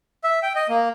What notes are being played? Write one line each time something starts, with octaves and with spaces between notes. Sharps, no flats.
E5
G5
D#5
A#3